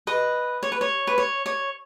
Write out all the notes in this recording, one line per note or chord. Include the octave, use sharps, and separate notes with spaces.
B4 D#5
C#5
B4
C#5
B4
C#5
C#5